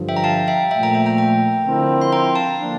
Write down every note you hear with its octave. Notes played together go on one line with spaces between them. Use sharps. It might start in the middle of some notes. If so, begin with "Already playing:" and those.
Already playing: G2 D3 F3
E5 G5
A#5
F5 A5
E5 G5
A#2 F3 A3 E5 G5
G5 A#5
E5 G5
G5 A#5
G5 A#5
D3 F3 C4 E4 A#4
C6
G5 A#5
F5 A5
D3 F3 A#3 D4